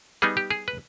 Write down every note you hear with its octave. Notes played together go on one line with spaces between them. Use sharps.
G3 B3 D#4 G#4
G4
G#4
B4